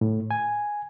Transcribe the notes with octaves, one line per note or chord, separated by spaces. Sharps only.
A2
G#5